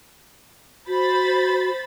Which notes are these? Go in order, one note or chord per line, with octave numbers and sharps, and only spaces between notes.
F#4 C5 B5 A6